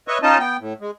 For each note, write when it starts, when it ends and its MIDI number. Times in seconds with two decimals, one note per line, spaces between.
0.08 0.18 71
0.08 0.18 73
0.08 0.18 75
0.08 0.18 76
0.08 0.18 85
0.23 0.38 61
0.23 0.38 63
0.23 0.38 65
0.23 0.38 75
0.23 0.38 81
0.39 0.57 59
0.39 0.57 79
0.60 0.73 45
0.81 0.91 56